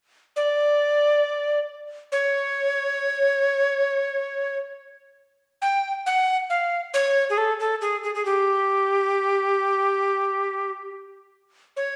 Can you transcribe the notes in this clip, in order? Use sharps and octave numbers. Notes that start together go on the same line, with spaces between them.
D5
C#5
G5
F#5
F5
C#5
G#4
A4
A4
G#4
G#4
G#4
G4
C#5